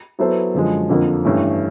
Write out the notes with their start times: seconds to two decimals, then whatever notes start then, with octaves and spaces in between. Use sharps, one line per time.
0.19 F#3 B3 E4 A4 C5
0.54 F#2 D3 F3 G#3
0.90 F2 D3 F3 A#3
1.25 G2 E3 A3 C#4 E4